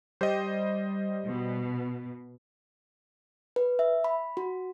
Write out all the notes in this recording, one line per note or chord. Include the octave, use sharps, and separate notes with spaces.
G3 C5 D#5
B2
B4
E5
B5
F#4